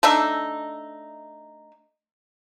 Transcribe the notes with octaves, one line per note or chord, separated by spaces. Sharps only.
A3 D4 D#4 E5